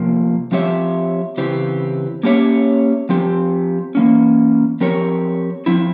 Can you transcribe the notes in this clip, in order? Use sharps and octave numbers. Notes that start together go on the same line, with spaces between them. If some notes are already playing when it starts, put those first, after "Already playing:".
Already playing: C3 F3 A#3
F3 C4 G4 C#5 E5
C#3 E3 C4 G4
A#3 C#4 G4 C#5 E5
F3 C4 G4
E3 A#3 C#4
F3 C4 G4 A#4 C#5
F3 C4 E4